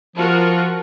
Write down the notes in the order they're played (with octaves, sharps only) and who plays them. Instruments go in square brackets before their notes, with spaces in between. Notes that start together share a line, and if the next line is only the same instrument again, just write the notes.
[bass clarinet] F3 [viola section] F4 F#4 A#4